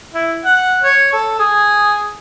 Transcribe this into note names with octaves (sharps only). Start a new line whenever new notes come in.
E4
F#5
C#5
A4
G#4